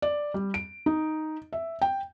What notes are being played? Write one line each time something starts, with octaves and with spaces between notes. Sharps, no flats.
D5
G3
D7
D#4
E5
G5